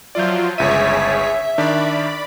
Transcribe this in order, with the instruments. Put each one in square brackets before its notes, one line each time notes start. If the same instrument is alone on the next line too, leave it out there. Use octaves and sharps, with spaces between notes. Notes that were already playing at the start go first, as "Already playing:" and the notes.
[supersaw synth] F3 F#3 F4 [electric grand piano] D5 E5 G6
[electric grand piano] G1 C#2 D#7 [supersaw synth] G#4 C#5 B6 [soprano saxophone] E5
[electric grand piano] D#3 D4 [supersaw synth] D5 B5